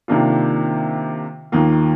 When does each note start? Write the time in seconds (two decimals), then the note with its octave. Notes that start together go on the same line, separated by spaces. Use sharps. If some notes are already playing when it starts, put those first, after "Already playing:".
0.08 C3 D#3 A#3 D4 F4
1.52 D#2 D#3 A#3 F4